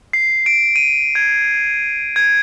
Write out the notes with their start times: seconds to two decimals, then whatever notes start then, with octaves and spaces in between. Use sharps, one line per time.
0.13 C7
0.46 D7
0.76 D#7
1.15 G#6
2.16 G#6